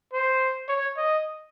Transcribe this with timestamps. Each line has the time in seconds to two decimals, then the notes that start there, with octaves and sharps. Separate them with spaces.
0.13 C5
0.69 C#5
0.97 D#5